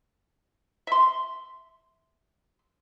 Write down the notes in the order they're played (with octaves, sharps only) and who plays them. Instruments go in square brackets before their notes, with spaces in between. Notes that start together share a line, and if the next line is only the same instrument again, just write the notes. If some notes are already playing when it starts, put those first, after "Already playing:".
[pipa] E5 C6